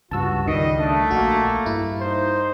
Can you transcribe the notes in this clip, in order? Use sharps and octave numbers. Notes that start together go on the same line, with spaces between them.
C#2 G2 F#4 A5 E6
C#2 D#3 G3 D#5
A3 D4
A#1 A#3 F#4
G2 E4
D#4 C5